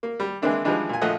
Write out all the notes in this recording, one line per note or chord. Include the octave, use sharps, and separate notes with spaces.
A#3
G3
E3 G#3 A#3 C4 D4 E4
E3 F3 G3 G#3 D4 D#4
A#2 G#5
A#1 F3 A3 D#5 F#5